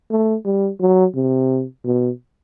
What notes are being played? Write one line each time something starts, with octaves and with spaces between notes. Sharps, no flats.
A3
G3
F#3
C3
B2